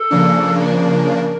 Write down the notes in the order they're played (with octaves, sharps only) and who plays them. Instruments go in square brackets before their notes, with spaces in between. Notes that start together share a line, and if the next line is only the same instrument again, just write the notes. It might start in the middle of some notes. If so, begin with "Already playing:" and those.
Already playing: [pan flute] A4
[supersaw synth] C#3 F3 A#3 D4
[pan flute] A4
A#4